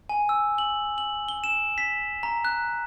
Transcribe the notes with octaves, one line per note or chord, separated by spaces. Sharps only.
G#5
E6
F#7
F#7
G7
E7
B6
A#5
F#6